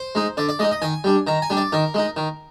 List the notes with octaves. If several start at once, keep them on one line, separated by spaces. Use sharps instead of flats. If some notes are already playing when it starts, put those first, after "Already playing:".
Already playing: C5
G#3 D#4
D3 D5
D5
G#3 D#4 D#5
D#5
D#3 G#5
G3 D4
D#3 A#5
G#5
G3 D4
D5
D#3 A#4
G#3 D#4
D#3